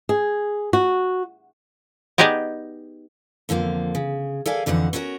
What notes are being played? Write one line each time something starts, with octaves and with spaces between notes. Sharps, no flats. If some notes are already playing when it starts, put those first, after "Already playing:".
G#4
F#4
B3 D#4 G4 G#4 D5 D#5
F2 D3 F3 A#3
C#3
A4 A#4 D5 E5 F5 G#5
F2 D3 E3 D#4 F#5
C#4 E4 F#4 A#4 C#5